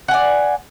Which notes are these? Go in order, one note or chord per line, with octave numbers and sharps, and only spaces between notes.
D5 F#5 G#5